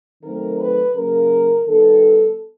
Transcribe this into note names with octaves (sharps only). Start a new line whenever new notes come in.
D#3 F#3 A3 C4 A#4
B4
C#3 F#3 A#3 A#4
D#3 G3 B3 A4